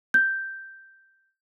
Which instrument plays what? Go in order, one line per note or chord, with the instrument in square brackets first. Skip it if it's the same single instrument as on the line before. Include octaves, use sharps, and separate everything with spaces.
[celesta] G6